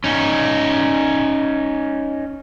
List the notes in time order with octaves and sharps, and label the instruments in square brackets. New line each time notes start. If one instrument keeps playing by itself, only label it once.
[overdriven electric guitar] C#4 D#4